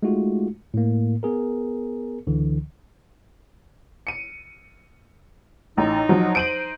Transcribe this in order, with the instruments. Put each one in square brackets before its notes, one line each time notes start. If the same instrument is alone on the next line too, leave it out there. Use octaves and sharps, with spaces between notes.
[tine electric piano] G#3 A3 D#4 F4 F#4
A2 A#3
B3 G#4 A#4
C#2 D3 E3
[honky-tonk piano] C#7 D#7
[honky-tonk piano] A1 A#5 [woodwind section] D#4
[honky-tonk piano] F3 F#3
[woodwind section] D#4 C5 [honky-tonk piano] D7 D#7 F#7